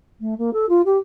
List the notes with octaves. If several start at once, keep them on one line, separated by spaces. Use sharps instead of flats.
A3
A#3
A4
F4
G4